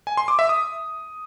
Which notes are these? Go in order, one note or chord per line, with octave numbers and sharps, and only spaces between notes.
G#5
C6
D6
E5
D#6